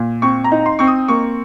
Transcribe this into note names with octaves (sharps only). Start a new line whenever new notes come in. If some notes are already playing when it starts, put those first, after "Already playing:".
Already playing: A#2
C4 C#6
A#5
D#4
C6
C4 C#6
D#6
A#3 C#6